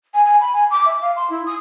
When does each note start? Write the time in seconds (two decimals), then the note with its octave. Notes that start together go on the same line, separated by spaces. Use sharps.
0.14 G#5
0.25 G#5
0.40 B5
0.53 G#5
0.70 D6
0.86 E5
1.01 F5
1.16 C6
1.30 E4
1.46 D#6